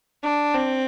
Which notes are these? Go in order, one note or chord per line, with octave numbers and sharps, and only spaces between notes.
D4
C4